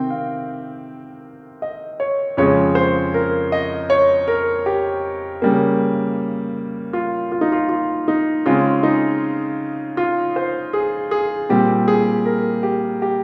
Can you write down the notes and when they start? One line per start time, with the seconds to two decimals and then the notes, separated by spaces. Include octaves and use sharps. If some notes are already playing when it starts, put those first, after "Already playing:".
Already playing: C3 D#3 C4 G5
0.10 F5
1.62 D#5
2.00 C#5
2.37 F2 C#3 G#3 C#5
2.75 C5
3.14 A#4
3.52 D#5
3.90 C#5
4.28 A#4
4.66 G4
5.42 C#3 G3 A#3
6.93 F4
7.32 F4
7.41 D#4
7.52 F4
7.69 F4
8.08 D#4
8.46 C#3 G#3 C4 F4
8.83 D#4
9.97 F4
10.36 C5
10.73 G#4
11.11 G#4
11.49 A#2 G3 C4 G4
11.88 G#4
12.26 A#4
12.63 G4
13.02 G4